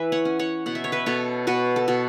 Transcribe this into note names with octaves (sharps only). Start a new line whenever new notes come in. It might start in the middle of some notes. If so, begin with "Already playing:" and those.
Already playing: E3 E4 B4 E5
C#5 F#5
C#4
C#5 F#5
B2 F#5
E5
C#5
B4 E5
B2 A4 C#5
B2 F#4 B4
A4
B2 F#4